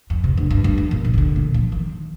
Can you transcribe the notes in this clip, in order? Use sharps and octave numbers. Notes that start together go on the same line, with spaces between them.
F2
C3
D3
G2
G2
F2
A#2
D#3
C3
D3
A#2
F3
D#3